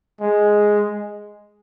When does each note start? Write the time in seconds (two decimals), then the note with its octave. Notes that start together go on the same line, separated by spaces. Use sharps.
0.21 G#3